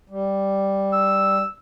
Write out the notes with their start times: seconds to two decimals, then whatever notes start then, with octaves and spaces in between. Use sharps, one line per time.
0.09 G3
0.93 E6